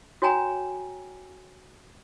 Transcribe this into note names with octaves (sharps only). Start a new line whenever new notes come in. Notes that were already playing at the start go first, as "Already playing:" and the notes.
F#4 C#5 G5 G#5 A#5